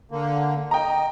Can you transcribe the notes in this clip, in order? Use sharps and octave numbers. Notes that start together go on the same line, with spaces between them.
D3 A#3
D#5 G5 A#5